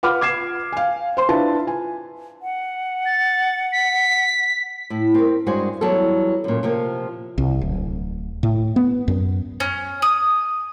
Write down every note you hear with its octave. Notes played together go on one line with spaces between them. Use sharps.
F4 B4 F#5 B5 D6 F6
D6 G#6 C7 E7
F5 G#5
C5 C6
D4 E4 F4 B4 A5
G#5
F#5
A6
B6
A2
C4 A#4
G2 G#3 F#4 C5 G#5
E3 F#3 G3 B3 A4
F#2 A#2
C3 F3 A#3
C2
D1
A2
B3
F#2
C#4
D#6